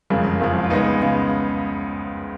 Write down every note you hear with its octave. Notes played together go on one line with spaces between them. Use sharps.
F#1 F2 C#3 F3 G#3
F#1 F2 C#3 F3 G#3
F4
C#2 C#3 G#3 B3 D#4
C#3 G#3